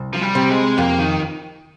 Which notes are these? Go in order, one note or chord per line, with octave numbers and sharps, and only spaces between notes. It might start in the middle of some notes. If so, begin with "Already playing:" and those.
Already playing: C2
F3
G3
C3
G#3
F2 A#3
D#3